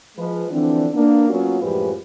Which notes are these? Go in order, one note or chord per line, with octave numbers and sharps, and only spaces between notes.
F3 G#3 B4
D3 E3 F3 C4 D4
A#3 B3 D4
F#3 A#3 B3 C#4 F4 F#4
F#2 A2 F3 G#3 G4 B4